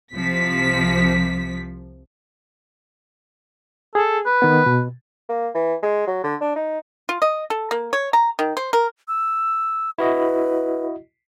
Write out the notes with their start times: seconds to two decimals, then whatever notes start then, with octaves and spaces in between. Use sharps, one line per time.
0.13 C2 C3 F3 B6
3.95 G#4 A4
4.26 B4
4.42 D#3 B3
4.66 B2
5.29 A#3
5.54 E3
5.83 G#3
6.07 F#3
6.23 D3
6.41 D4
6.55 D#4
7.09 F4
7.22 D#5
7.50 A4
7.71 A#3
7.93 C#5
8.13 A#5
8.39 D#3
8.57 C5
8.73 A#4
9.08 E6
9.98 E4 F#4 B4 D#5